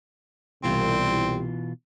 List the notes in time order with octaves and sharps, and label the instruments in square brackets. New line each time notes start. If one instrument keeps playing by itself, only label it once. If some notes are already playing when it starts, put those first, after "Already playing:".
[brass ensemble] C2 [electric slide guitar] B2 E3 F4 [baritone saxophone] C4